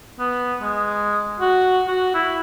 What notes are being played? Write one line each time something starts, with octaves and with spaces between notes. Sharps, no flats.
B3
G#3
F#4
F#4
E4